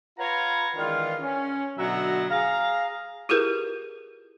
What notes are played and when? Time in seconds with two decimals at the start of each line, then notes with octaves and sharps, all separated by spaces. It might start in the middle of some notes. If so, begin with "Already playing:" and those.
0.19 F4 B4 C#5 F#5 A#5
0.76 D#3 E3 G#3 D4 F4
1.21 C#4
1.78 B2 D3 F#3 E5 F#5 A#5
2.30 G#4 F5 A#5
3.29 E4 F4 G4 G#4 A#4 B4